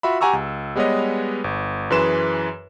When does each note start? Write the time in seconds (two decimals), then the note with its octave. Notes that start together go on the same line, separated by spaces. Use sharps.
0.03 F4 F#4 E5 B5
0.21 G4 F#5 G#5 A#5 C#6 E6
0.33 C#2
0.76 G3 G#3 B3 B4 C#5 D#5
1.44 G1
1.90 F#2 E3 G#4 B4 C6 E7